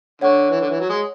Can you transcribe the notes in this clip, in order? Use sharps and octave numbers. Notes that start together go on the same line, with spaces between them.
D3 C#5 F#5 C#6
E3
D3
E3
F#3
G#3